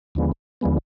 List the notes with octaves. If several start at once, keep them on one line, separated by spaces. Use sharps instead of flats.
D#2 D3 F3 G#3 B3
D#2 D3 F3 G#3 B3